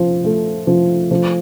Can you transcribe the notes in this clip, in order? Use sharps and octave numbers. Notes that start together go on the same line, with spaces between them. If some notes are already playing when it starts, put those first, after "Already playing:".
Already playing: F3
A3
F3
F3